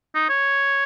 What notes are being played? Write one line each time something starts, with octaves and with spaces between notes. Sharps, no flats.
D#4
C#5